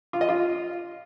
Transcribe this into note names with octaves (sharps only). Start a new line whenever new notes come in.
F4
D#5
F4